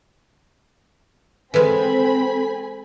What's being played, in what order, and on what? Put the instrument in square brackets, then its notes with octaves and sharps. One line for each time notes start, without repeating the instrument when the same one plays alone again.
[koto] E3 G#3 [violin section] C4 B5 [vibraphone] A4 [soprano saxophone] G#5